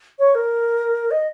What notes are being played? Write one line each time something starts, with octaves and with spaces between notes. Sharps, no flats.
C#5
A#4
D#5